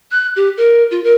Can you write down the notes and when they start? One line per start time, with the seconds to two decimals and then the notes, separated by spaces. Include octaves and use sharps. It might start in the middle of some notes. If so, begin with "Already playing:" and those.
0.11 F#6
0.36 G4
0.57 A#4
0.91 F4
1.04 A#4